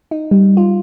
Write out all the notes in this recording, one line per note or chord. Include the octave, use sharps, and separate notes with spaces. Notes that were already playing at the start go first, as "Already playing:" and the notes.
D#4
G3
F4